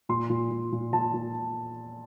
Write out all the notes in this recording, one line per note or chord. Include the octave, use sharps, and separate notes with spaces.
A#2 C6
A#2
A#2
A#2
A#2 A5
A#2